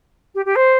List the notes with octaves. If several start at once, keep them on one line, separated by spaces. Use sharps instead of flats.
G4
G4
C5